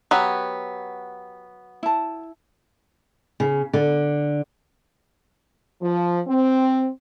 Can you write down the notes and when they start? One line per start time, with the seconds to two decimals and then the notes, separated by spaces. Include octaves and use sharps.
0.11 F#3 B3 G4
1.83 E4 A5
3.40 C#3
3.73 D3
5.82 F3
6.28 C4